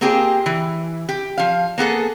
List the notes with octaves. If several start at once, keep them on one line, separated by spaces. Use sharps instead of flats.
A#3 C4 F4 G4 G#4
E3
G4
F3 F5
A#3 B3 G#4 A4